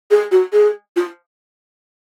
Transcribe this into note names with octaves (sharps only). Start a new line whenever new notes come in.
G#4
F#4
G#4
F4